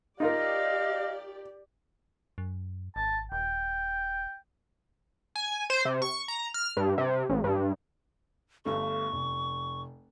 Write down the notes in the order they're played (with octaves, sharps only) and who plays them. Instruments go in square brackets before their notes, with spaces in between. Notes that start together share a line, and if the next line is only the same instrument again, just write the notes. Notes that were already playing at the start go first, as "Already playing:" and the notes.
[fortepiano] D#4 F4 A#4 [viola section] G4 D5 [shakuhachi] D#5 [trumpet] F5
[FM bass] F#2
[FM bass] G#1 [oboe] A5
[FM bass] D#1 [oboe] G5
[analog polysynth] G#5
C5
C3
C#6
A#5
F6
G2
C3
A1
G2
[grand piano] G1 G2 A3 [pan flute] C#6
[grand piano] F1